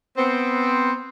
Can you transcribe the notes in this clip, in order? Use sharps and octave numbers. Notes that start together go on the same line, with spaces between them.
B3 C4